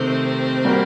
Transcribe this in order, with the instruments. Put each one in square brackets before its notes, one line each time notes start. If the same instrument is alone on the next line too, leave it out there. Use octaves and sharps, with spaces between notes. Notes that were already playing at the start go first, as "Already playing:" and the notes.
Already playing: [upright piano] C3 D#3 A3 [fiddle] C4
[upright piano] G3 A#3 F#4 A#4